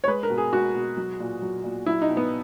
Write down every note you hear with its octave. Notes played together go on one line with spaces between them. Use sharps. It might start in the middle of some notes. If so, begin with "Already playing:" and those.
C#5
G#3 B4
A#4
B2
G#4
G#3 F#4
B2
F#3
A#2
F#3
A#2
F#3 E4
D#4
B2
B3